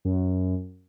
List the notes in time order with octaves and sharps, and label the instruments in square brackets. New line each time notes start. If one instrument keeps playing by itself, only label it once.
[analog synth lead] F#2